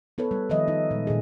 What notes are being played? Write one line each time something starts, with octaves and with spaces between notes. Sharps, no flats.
B3 A4 B4 C#5
G3
D#3 F3 G3 D#5 E5
D#4
A#2 G#3
A#2 D#3 G#4